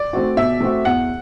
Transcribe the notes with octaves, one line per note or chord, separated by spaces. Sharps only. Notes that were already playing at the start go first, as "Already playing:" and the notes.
Already playing: D5
A3 C4 F#4
B2 E5
A3 C4 F#4
E2 F#5